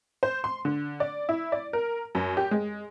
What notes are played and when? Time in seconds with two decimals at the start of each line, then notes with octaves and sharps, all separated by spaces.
0.23 C5
0.44 C6
0.65 D3
1.00 D5
1.29 E4
1.52 D5
1.73 A#4
2.15 F#2
2.37 G4
2.51 G#3